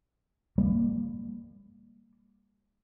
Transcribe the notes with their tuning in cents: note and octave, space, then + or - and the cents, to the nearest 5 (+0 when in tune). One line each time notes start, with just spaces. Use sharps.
G3 +35 A#3 +0